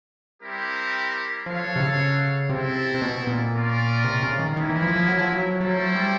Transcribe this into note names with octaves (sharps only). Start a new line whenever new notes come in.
G3 C4 E4 G4 A#4
F3 F#4 A4 C#5 F5
C3
C#3
C3 C4 E4 A4
C3
B2
A#2
C#4 F4 A#4 D5
C3
C#3
D#3
D#3 A#3 C#4 E4
E3
F3
F3
F#3
F3
F#3
F#3 A3 C#4 E4 A4 C5
G3